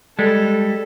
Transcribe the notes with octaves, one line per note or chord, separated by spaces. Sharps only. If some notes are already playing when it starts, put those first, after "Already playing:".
G3 G#3 A4